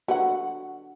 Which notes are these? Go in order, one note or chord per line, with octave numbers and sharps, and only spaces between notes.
D3 F#4 B4 F#5